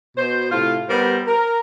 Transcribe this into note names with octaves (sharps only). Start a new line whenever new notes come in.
B2 C5
A2 C3 F4
G3 B3 A#4 C5
A#4